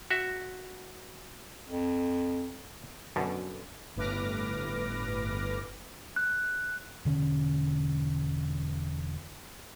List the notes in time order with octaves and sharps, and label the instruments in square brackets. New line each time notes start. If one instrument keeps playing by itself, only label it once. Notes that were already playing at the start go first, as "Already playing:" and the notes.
[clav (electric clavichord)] F#4 E5
[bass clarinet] F2
[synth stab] F#2 B2 D3
[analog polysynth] G1 A2 B4 D6 F6 A#6
[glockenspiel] F#6
[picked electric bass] E1 D3 C4 C#4